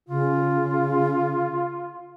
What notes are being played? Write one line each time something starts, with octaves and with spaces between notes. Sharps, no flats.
C#3 F4